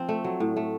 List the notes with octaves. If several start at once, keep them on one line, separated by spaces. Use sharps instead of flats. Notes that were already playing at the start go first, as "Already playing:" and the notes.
Already playing: F3 C4
A3
F#3
A2
A3